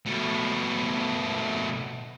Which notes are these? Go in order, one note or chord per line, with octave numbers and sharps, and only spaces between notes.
B2 A3